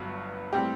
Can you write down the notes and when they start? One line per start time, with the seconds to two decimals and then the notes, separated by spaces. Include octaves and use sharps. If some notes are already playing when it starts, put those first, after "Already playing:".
Already playing: G1 G2 F#3 B3 F#4
0.53 A2 G3 C4 G4